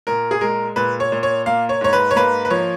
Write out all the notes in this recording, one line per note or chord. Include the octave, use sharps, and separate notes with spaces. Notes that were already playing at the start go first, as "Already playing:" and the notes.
A#2 A#4
G#4
G#3 A#4
A#2 B4
C#5
A#2
C#5
A#3 F5
C#5
G#2 C#5
B4
C#5
A#3 B4
B4
F3 C#5